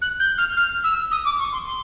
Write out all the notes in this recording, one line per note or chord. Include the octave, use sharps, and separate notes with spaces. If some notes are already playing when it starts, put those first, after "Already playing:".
F#6
G6
F6
F6
E6
D#6
D6
C#6
C6
C6